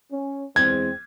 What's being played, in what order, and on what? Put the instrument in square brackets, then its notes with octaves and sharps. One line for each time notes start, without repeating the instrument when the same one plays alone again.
[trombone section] C#4
[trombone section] E2 G#3 C4 [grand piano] G#6